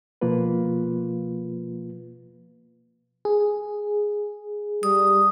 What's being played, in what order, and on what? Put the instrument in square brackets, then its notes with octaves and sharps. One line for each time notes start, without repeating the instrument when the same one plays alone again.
[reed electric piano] B2 F3 A#3 F4 B4
[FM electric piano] G#4
[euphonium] G3 [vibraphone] D#6